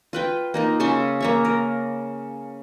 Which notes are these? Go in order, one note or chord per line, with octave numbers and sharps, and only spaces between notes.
F4 B4 G5
A#3 D#4 F4
C#3 C#4 E5 C6
A#3 C#5 E5
A#4